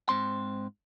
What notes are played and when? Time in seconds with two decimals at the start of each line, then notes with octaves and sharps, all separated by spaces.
0.09 G#2 C4 C6